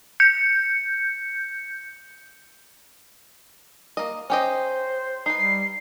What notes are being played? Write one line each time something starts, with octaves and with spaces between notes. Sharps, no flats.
G6 C#7
A#3 D#5
C#4 G4 C5 D#5
D#4 B4 C7
G3 C7